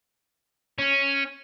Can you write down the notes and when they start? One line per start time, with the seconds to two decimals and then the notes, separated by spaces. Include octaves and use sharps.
0.79 C#4